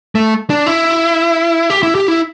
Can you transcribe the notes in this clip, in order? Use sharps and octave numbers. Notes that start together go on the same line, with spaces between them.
A3
D4
E4
G4
E4
G4
E4